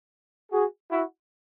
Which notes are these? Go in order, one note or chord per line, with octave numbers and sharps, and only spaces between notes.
F#4 G#4
E4 F#4